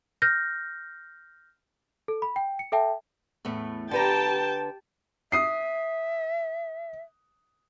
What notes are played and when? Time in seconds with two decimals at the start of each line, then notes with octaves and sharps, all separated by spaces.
0.22 F6 G6 A#6
2.08 A4
2.22 B5
2.36 G5
2.59 C#7
2.72 A4 E5 G5 A5
3.45 E2 A2 A3
3.91 D3 G4 B4 G5 A5 A#5
5.32 E5 D#6 C7